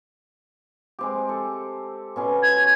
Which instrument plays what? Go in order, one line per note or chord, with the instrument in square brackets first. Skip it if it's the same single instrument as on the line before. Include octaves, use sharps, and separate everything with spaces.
[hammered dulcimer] G#3 C4 G4
A4
B2 C#4 C6
[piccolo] G#6